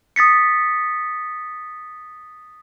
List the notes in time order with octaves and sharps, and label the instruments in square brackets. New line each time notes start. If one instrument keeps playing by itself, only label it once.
[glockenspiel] D#6 A6 B6 C#7